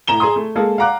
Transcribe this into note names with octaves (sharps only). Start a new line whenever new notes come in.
A2 A#5 E7 G7
G#4 A#5 C6 D#6
A3
G#3 A#3 G#4 A4
F5 F#5 A#5 D6 F#6